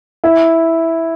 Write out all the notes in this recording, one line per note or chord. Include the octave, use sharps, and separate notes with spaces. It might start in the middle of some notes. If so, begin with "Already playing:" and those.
E4